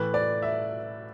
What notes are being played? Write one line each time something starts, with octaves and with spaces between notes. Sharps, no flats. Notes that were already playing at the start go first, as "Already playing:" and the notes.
Already playing: A2 E3 B4
D5
E5